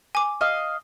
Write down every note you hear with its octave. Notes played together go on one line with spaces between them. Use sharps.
G#5 D6
D#5 F5